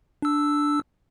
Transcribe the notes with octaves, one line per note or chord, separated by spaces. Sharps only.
D4 E6